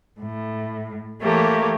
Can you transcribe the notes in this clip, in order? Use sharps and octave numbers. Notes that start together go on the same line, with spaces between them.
A2
E3 A3 A#3 G4 A4 C#5